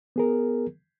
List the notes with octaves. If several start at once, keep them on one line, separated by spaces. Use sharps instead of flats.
B3 G#4 A#4